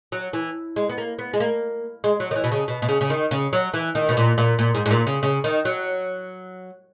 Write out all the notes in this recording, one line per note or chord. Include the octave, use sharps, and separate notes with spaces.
F#3
E3
G#3
B3
A#3
B3
G#3
A#3
G#3
F#3
D#3
E3
B2
C#3
B2
B2
C#3
C#3
D#3
C#3
F#3
E3
D#3
B2
A#2
A#2
A#2
G#2
G#2
A#2
C#3
C#3
D#3
F#3